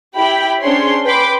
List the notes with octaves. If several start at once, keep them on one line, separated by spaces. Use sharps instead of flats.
E4 G4 G5 B5
C#4 D4 G#4 C5 C#5 C6
B4 G5 B5 C6 D6